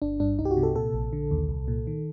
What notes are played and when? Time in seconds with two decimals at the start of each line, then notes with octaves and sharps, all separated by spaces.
0.02 G1 D4
0.20 G2 D4
0.39 C2 D#4
0.45 G4
0.51 F#4
0.57 C3
0.63 A4
0.76 A#2 A4
0.94 A#1
1.13 D3
1.31 D#2
1.49 C2
1.68 A#2
1.87 D#3